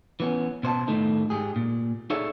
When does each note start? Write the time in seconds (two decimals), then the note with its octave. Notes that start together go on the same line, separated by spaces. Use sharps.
0.20 E3 B3 C#4
0.63 B2 C5 D#5 A5
0.88 A2 D#3 A3 D#4
1.30 G#2 G4 G#4
1.56 A#2
2.10 D#4 G#4 A4 C#5 D5 E5